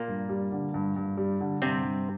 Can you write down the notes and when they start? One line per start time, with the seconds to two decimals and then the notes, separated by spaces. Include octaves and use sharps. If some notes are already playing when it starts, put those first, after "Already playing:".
Already playing: A#2 A#3
0.08 G2
0.29 G3
0.52 D3
0.74 G2
0.96 G2
1.17 G3
1.41 D3
1.62 G2 C3 C4
1.84 G2